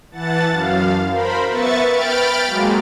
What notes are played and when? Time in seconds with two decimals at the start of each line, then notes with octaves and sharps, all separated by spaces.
0.12 E3 F#5 A5 A6
0.49 F#2 F5
1.09 A#4 C5 B5
1.49 B3 B4 E5 C#6 A6 C#7
1.86 G5 B5 F6 A6 D7
2.44 F#3 G#3 A#3